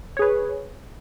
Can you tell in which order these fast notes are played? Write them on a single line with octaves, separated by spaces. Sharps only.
C#5 G#4 B4